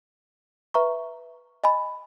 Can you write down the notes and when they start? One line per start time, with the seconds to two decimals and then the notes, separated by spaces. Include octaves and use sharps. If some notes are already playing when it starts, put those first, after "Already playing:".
0.74 B4 E5 A#5 C#6
1.64 D#5 G#5 B5